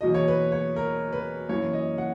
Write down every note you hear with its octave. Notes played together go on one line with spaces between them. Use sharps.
E2 B2 F#3 A#3 D#5
C#5
B4
C#5
A#4
B4
F#2 E3 A#3 C#5
D#5
F#5